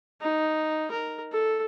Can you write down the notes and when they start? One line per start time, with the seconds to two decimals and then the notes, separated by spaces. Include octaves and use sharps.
0.21 D#4
0.91 A#4
1.32 A4